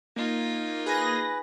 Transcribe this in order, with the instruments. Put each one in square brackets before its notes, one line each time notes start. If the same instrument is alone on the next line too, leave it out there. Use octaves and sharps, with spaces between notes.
[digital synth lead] A#3 [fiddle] D#4 F4
[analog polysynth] G#4 A#6 [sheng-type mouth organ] B4